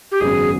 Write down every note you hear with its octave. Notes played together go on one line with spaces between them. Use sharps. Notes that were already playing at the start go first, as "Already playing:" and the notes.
G4
G#1 F#2 C#3 F#3 B3 G#4